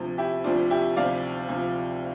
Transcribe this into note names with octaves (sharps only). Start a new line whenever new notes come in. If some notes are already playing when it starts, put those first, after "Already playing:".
Already playing: D2 C3 F3
E4 G4
D2 C3 F3 D4 F4
E4 G4
D2 C3 F3 D5 F5
D2 C3 F3